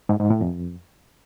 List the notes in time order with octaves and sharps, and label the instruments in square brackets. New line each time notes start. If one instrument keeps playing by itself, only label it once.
[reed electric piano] G#2
G#2
A2
F2